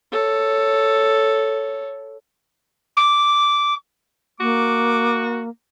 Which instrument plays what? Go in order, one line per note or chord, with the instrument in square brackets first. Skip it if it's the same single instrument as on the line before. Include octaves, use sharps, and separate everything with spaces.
[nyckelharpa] A4 C#5
[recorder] D6
[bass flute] A#3 [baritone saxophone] F#4 [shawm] D6